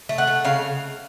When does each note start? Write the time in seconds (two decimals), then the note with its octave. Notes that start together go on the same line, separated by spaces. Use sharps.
0.09 A3
0.18 F#5
0.27 A3
0.45 C#3 F5